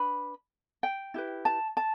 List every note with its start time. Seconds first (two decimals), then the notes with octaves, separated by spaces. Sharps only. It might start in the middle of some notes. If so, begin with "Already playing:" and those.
Already playing: D4 B4 B5
0.83 G5
1.14 E4 G4 B4
1.45 A5
1.77 A5